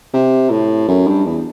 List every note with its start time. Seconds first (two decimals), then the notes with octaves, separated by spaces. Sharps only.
0.13 C3
0.50 A2
0.88 F#2
1.08 G2
1.26 E2